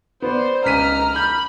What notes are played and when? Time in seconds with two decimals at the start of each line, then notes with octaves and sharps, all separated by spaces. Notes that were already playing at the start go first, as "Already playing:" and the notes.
0.22 B3 C5 D5
0.65 C#2 A#5 F6 B6 D#7
1.16 B5 G6